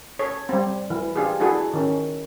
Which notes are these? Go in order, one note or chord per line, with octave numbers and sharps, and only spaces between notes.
A4 C#5
G3 C4
E3
D4 F4 G4 G#4
D4 E4 F#4 G#4 A4
D#3 C#4